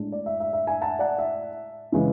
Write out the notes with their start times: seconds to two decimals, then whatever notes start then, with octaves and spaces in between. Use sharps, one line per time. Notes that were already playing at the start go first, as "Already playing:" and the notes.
Already playing: A2 G#3 D4
0.12 D5
0.26 E5
0.40 E5
0.53 E5
0.67 E5 G#5
0.81 F#5 A5
0.99 D5 F#5
1.18 E5
1.92 C#3 E3 G#3